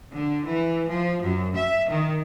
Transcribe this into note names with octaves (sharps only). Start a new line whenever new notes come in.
D3
E3
F3
F#2
E5
D#3